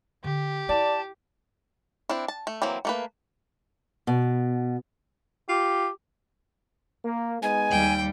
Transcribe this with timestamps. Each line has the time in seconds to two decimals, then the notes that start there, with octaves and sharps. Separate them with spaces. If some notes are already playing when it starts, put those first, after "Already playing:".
0.24 D3 G4
0.69 E4 D5 A5
2.09 C4 D4 E4
2.28 A5
2.47 A3
2.62 E3 F#3 A#3 C4
2.85 A3 A#3 B4
4.07 B2
5.49 F4 G4
7.05 A#3
7.42 G#3 B3 D#4 G#5
7.71 D#2 G3 G5